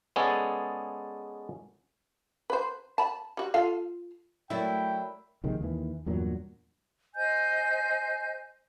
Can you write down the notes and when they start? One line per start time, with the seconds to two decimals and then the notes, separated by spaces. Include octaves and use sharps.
0.16 G#3 B3 C#4 G#4 A4 D5
2.50 B4 C5
2.98 A5 B5
3.37 G3 F#4
3.54 F4 A4 F5
4.50 F#3 A3 E4 A#4 D5 G5 E6
5.44 A#1 C3 D#3 G#3
5.61 D#2 D#3 E3
6.06 E2 G2 A#2 F#3
7.14 C5 D#5 G#5 G6